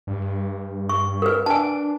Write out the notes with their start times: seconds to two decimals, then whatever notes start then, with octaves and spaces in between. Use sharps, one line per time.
0.07 G2
0.89 C#6
1.22 A#4 B4
1.46 D4 G#5 A5